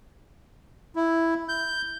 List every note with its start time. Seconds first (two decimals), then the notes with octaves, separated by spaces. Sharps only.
0.96 E4
1.49 G6